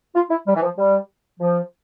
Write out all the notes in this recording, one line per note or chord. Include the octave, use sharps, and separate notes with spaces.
F4
E4
G3
E3
F3
G3
F3